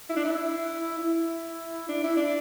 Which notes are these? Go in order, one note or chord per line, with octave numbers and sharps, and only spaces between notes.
E4
D4
E4
E4
D4
E4
D4